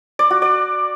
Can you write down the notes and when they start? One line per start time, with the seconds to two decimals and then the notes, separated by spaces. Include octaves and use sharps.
0.19 D5
0.31 F#4
0.42 D5